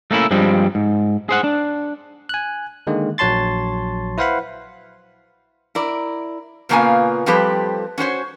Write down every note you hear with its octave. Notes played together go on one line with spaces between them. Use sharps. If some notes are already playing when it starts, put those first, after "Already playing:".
A3 A#3 C#4 E4
G2 F3 G3 G#3 C4
G#2
G#4 C5 F#5
D4
G#5 F#6
D3 D#3 G#3 A#3
A#1 F#3 C#5 A5 C6 A6
E4 B4 C5 F5 F#5 B5
E4 A#4 D5
A#2 C#3 A#3 B3 F4 G#5
F3 G3 C4 G4 A4 B4
C#4 F#4 C5 C#5